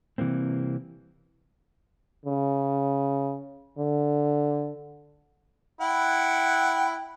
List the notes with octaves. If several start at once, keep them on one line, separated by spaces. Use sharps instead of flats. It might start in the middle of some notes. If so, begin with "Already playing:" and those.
C3 E3 G3 A#3 C4
C#3
D3
E4 F#5 G5